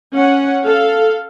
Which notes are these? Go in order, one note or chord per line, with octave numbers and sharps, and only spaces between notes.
C#4 F#5
A4 F5